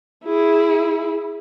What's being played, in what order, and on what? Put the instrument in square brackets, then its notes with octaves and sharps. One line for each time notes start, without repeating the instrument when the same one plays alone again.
[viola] E4 G#4